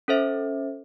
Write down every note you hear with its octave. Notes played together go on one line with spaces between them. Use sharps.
C#4 A4 C5 E5